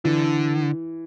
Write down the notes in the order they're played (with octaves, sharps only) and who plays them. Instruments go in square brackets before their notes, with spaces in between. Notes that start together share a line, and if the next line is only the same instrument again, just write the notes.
[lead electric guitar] D3 [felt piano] E3